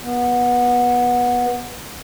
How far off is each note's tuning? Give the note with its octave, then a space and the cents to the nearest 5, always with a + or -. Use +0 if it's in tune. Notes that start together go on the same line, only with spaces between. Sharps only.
B3 -20